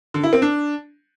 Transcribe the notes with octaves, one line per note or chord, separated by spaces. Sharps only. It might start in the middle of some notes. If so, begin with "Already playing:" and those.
D3
E4
C4
D4